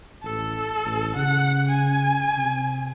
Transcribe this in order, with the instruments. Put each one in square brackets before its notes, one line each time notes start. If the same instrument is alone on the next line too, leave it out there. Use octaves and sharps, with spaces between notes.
[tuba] A1 [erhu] A4
[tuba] A1
[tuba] C#3 [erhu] F#5
[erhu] G#5
[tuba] C3